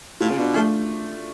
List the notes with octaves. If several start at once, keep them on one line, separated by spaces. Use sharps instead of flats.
A2 F4
C#3
B2 D4
F3 A3